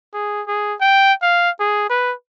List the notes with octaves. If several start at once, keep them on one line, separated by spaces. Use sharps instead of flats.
G#4
G#4
G5
F5
G#4
B4